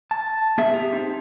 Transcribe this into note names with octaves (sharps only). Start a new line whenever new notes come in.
A5
B3 G#4 E5
G4
C4 D#4